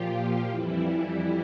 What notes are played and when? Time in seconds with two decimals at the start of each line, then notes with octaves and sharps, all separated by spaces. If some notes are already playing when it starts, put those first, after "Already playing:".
Already playing: A#2 F3 F4 G4
0.14 F4
0.49 F2 E3 G3 E4